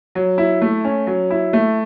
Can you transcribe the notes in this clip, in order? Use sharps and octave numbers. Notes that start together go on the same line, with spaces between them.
F#3
E4
A3
C#4
F#3
E4
A3